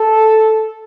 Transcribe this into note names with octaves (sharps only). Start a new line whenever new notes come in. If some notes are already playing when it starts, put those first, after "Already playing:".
Already playing: A4